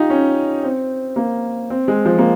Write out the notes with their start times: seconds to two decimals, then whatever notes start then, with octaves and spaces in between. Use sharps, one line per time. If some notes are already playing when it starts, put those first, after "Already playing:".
Already playing: D#4 F4 G4
0.10 C#4
0.63 C4
1.16 A#3
1.70 C4
1.88 G#3
2.05 F3
2.18 A#3